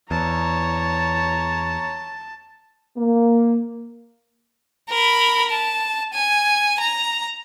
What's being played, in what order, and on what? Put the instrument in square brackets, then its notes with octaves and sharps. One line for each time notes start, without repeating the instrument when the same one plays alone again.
[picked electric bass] E2 [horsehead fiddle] C#5 A#5 [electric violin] A5
[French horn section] A#3
[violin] A#4 B5
A5
G#5
A#5